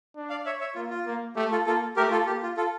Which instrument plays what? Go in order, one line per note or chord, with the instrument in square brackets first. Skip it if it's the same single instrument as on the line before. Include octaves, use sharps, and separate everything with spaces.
[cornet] D4
[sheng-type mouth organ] D5 F5
C#5 E5
C#5 E5
[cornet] A#3 [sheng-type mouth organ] F4
[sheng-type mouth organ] F4
[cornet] A#3
[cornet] A3 [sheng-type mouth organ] G4
[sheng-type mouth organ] F4 A4
[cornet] A#3 [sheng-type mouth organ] F4 A4
[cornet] A3 [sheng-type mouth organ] G4 A#4
[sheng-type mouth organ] F4 A4
[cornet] A#3 [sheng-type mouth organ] G4
[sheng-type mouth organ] F4
F4 A4